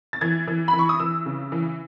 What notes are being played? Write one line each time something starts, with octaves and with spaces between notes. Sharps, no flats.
A6
E3 G#6
E3
B5
E3
C#6
D#6
E3 E6
C#3
E3